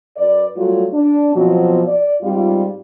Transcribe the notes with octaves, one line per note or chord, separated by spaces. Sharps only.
F#2 B4 D5
F#3 G3 A3 A#3 F4
D4
B2 F3 F#3 B3 C4
D5
G#2 G3 C4 F4